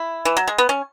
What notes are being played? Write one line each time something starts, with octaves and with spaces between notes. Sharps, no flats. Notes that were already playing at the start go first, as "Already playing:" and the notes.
Already playing: E4
E3
F#3
G#3
B3
C#4